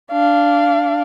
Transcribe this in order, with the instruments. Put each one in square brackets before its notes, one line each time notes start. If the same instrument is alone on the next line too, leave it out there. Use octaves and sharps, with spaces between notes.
[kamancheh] D4 F5